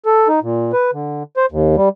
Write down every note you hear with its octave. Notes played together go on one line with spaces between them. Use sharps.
A4
D#4
A#2
B4
D3
C5
D#2
G3